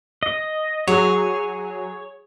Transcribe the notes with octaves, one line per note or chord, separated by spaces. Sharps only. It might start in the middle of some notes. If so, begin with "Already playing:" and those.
D#5
F#3 G#4 C#5